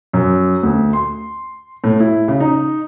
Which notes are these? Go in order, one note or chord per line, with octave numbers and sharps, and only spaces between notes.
F#2
D2
C6
A2
E4
C#3
D#4